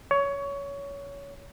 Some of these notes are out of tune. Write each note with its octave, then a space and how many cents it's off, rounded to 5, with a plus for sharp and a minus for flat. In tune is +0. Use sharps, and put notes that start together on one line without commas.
C#5 +20